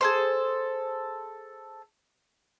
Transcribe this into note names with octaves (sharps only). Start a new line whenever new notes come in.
G#4 A4 C5